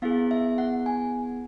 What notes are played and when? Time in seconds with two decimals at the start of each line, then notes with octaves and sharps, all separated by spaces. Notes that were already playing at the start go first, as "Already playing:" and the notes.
0.02 B3 E4 G#4 F5
0.31 E5
0.58 F#5
0.86 G#5